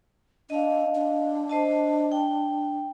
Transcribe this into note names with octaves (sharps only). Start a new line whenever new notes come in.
D4 D#5 F5
D4
C5 D#5 A5
G5